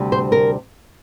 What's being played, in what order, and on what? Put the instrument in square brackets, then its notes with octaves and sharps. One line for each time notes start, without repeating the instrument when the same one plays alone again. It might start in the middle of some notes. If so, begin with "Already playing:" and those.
Already playing: [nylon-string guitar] D2 C3 G3
C5
A#4